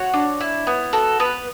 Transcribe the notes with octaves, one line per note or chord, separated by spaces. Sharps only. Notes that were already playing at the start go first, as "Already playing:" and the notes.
Already playing: F#4 C#5
D4
E4
B3
F#4 A4
B3 B4